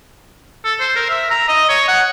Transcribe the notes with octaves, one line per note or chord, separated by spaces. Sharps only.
A4
C5
A#4
E5
A#5
D#5
C#5
F#5